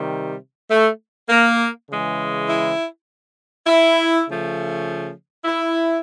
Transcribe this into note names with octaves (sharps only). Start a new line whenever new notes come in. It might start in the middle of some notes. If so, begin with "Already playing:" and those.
Already playing: C3 D#3 G3
A3
A#3
C#3 E3 G#3
E4
E4
C#3 F3 A3
E4